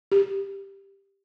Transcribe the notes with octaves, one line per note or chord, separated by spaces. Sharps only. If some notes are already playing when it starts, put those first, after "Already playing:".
G4